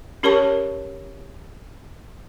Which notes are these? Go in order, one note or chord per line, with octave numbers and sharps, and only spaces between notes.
C#4 G4 A#4 C#5 A5 C#6